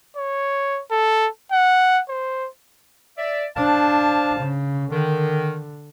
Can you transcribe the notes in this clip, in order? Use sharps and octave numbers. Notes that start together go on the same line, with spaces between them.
C#5
A4
F#5
C5
D5 E5
D4 C5 F5 A5
C#3
D3 D#3